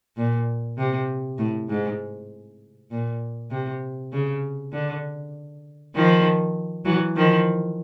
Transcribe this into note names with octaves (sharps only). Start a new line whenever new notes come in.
A#2
C3
A2
G#2
A#2
C3
C#3
D3
D#3 F3
E3 F#3
D#3 F3